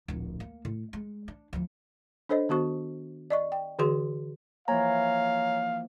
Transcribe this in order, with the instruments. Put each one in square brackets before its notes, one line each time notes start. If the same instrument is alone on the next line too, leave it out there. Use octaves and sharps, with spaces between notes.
[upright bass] D1 A#1
A#3
A2
G#3
D4
D2 F3
[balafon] D4 A4 C5 C#5 D#5
D#3 B3 F#4 C#6
D5 D#5 C#6
G5
D3 E3 F#4 G#4 C6
[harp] E3 F3 A#3 [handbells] C#5 G#5 A#5 [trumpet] F5